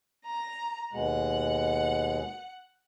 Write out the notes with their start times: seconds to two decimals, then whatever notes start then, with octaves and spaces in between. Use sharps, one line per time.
0.24 A#5
0.93 D#2 B2 G#3 F#5